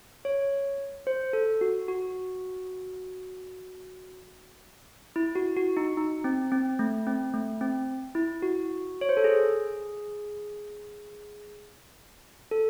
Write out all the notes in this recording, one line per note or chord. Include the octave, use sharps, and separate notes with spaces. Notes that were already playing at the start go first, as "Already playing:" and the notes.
C#5
C5
A4
F#4
F#4
E4
F#4
F#4
D#4
D#4
C4
C4
A3
C4
A3
C4
E4
F#4
C#5
C5
A4
G#4
A4